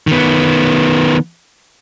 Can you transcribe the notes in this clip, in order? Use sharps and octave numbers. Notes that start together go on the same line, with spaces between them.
D#3 B3